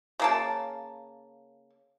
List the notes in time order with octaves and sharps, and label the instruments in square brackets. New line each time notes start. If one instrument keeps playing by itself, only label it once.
[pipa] C#3 A#3 A5